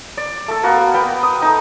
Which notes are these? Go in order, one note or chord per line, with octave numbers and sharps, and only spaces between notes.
D5
A3 A4
A#3 B3 F#4
B3 B4 G5
D#6
A3 D#4